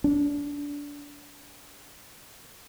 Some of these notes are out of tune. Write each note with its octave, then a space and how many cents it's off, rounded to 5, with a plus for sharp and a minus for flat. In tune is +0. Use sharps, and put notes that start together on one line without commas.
D4 -25